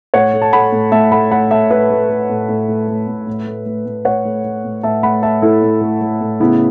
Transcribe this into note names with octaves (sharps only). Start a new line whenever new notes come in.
A2 C#5 F#5
A3
A5
A3 F#5 B5
A2
A2 E5 A5
A3 F#5 B5
A3 F#5 B5
A2 E5 A5
A2 B4 E5
A3
A3
A2
A2
A3
A3
A2
A2
A3
A3
A2
A2 C#5 F#5
A3
A3
A2
A2 E5 A5
A3 F#5 B5
A3 E5 A5
A2 E4 A4
A2
A3
A3
A2
C#3 B3 E4